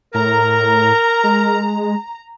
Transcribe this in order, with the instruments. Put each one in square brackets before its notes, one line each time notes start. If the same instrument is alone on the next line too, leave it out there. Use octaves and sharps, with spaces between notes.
[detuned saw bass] A2 [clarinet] A#4 [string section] A#5
[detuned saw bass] G#3